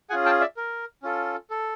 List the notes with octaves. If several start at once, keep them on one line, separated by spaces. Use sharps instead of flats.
C#4 F4 G#4 F#5 G#5
G5 A5
D5 E5
A#4
C#4 F4 A4
A4